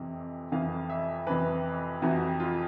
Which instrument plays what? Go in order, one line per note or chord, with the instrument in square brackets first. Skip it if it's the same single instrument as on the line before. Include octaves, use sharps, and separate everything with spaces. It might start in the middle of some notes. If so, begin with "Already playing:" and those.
Already playing: [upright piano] F2 C3 E3
F2 C3 E3 F5
E5
F2 C3 E3 B4
F2 C3 E3 F#4
F4